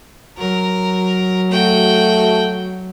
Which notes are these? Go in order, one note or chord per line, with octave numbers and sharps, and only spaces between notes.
F#3 A#4
A3 F#4 G5